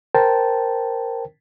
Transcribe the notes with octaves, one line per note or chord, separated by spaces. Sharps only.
A#4 C5 G5 A5